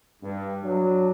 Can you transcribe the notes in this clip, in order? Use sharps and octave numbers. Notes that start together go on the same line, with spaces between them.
G2
F#3 D4